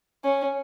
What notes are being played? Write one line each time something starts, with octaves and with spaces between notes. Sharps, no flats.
C#4